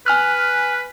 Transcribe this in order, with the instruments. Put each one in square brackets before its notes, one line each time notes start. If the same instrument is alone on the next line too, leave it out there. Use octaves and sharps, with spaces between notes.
[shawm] B4 [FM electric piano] G#5 F6 F#6